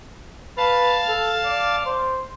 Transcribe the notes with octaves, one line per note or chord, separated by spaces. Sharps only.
B4 F5 A5
A4
D5
C5